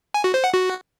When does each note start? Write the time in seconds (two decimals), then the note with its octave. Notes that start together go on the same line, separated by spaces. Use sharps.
0.14 G#5
0.24 F#4
0.34 C5
0.44 F#5
0.53 F#4